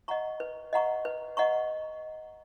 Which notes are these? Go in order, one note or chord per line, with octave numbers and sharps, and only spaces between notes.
D#5 F#5 A#5 C#6
B4
D#5 F#5 A#5 C#6
B4
D#5 F#5 A#5 C#6